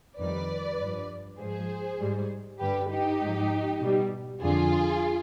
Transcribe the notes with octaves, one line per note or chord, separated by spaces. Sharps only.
F2 D#3 G3 B4 D5
G2 F3
G#2 F3 G#4 C5
G#2 G3
G2 D3 G3 G4 B4
D#4 G4
G#2 F3
B2 G3
F2 D3 F3 F4 G#4